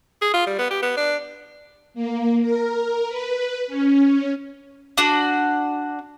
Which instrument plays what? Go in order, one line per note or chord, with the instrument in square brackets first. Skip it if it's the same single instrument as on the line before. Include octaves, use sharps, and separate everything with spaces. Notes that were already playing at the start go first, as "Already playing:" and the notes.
[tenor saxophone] G#4
F4
G3
B3
G4
B3
D4
[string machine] A#3
A#4
B4
C#4
[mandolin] D4 F#4